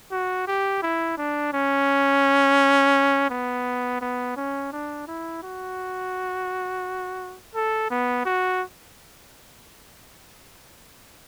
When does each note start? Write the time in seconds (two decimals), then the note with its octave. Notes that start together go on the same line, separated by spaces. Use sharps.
0.12 F#4
0.47 G4
0.82 E4
1.17 D4
1.53 C#4
3.30 B3
4.01 B3
4.37 C#4
4.72 D4
5.07 E4
5.43 F#4
7.55 A4
7.91 B3
8.26 F#4